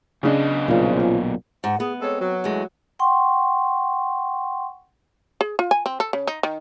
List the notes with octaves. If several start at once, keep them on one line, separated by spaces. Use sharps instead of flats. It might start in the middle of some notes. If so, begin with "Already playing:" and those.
F#2 C#3 B3 D4 D#5
B1 A#2 F3 C#4 F4
G#2 F#5
B3 G#4
G#3 C4 A4 C#5
F#3
E2 G#3 A3
F#5 G5 C6 C#6
G#4
F4
G#5
C4
A4
C#3
D#4
D#3